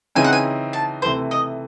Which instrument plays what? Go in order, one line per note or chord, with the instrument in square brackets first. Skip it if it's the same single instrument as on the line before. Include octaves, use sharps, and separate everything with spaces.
[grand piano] C#3 E3 C4 D#4 [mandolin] G#5
[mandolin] F#5
G#5
A5
[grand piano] C3 E3 A3 [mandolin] C5
[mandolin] D#5